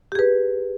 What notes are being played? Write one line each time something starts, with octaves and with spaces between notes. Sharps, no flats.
G4 G#4 B4